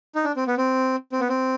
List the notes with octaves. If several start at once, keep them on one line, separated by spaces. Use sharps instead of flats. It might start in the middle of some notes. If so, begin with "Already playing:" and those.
D#4
D4
C4
B3
C4
C4
B3
C4